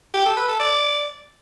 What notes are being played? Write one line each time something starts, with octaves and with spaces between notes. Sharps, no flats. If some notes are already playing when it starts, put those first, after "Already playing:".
G4
A4
B4
A4
D5